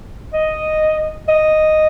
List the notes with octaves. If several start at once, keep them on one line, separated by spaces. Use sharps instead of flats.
D#5
D#5